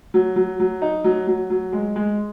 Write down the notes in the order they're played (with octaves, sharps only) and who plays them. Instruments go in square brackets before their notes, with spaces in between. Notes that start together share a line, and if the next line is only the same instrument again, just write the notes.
[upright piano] F#3
F#3
F#3
D#4
F#3
F#3
F#3
G#3
G#3